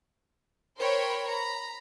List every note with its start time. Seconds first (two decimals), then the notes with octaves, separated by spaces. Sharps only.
0.78 A#4 C5 C#5 G5 B5
1.30 A#5 B5